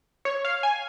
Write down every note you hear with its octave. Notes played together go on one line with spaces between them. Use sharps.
C#5
F5
G#5